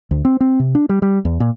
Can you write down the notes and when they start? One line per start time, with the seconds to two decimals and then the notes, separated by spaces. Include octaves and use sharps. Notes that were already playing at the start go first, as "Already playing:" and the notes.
0.11 D2
0.25 C4
0.41 C4
0.60 C3
0.75 D4
0.89 G3
1.02 G3
1.25 E2
1.40 A#2